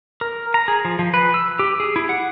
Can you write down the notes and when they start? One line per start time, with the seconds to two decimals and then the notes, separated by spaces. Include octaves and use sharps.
0.21 A#4
0.54 A#5
0.68 G#4
0.85 F3
0.99 F3
1.14 B4
1.34 E6
1.59 G4
1.80 G#4
1.96 E4
2.09 F#5